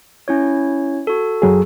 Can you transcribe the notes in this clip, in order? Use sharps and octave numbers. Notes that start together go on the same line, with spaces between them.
C#4 E4 C#5
F#4 A4
F#2 F#3 G#4